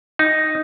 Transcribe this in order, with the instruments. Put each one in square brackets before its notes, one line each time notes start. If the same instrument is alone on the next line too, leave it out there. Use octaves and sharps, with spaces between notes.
[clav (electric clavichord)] D#4